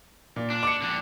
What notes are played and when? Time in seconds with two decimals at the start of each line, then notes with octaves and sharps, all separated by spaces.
0.36 A#2
0.50 D4
0.63 D6 C#7
0.82 F2 D3